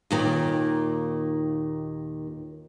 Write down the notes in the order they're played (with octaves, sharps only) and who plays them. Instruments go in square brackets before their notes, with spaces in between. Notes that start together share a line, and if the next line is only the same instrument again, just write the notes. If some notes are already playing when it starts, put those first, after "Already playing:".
[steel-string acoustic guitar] D#2 A#2 D#3